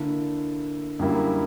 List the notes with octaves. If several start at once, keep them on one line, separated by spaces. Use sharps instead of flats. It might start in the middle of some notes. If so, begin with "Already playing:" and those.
Already playing: D3 A#3 E4
F#2 D3 G3 A#3 E4